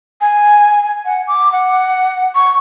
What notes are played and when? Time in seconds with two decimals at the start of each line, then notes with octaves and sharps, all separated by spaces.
0.21 G#5
1.05 F#5
1.27 D6
1.52 F#5
2.35 C#6